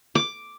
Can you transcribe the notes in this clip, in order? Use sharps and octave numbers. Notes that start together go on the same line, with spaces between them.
D6